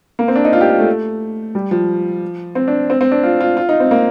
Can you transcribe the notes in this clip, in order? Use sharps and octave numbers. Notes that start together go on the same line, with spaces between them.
A#3
C4
D4
D#4
F4
G4
F4
A3
G3
F3
C4
D4
C4
C4
D4
F4
F4
F4
D#4
C4
A#3